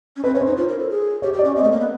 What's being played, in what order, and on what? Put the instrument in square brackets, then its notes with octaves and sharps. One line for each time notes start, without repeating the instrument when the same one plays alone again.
[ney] C#4
[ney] C4 [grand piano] B4
[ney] C#4 [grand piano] C#5
[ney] D#4 [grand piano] C5
[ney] F4
A#4
A4
G#4
[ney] G4 [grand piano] C#5
[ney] G4
[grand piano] D5
[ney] C#4
[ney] C4 [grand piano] D#5
[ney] A3
A#3
B3